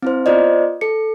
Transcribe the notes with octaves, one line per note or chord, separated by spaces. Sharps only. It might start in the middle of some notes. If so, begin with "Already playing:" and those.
C4 E4 C5
B3 F4 C5 D5 D#5
A4 C#7